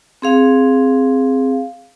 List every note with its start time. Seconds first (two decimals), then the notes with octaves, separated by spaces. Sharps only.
0.22 C4 G#4 F5